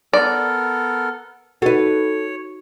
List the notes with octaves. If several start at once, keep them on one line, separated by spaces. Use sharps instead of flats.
B3 A4 A#4 D5
D#4 F#4 A4 B4 C#5